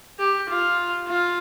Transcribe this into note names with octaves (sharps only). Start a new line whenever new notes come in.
G4
F4
F4